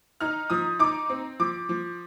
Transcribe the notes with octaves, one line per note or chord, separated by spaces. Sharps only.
D#4 F6
F3 D#6
D#4 D6
C4
F3 D6
F3